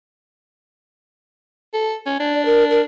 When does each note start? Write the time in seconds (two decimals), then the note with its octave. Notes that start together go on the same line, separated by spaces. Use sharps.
1.74 A4
2.06 C#4
2.20 D4
2.33 D5
2.45 A#4
2.71 A#4